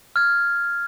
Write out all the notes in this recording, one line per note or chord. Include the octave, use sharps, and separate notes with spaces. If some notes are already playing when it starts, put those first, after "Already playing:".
F6 G#6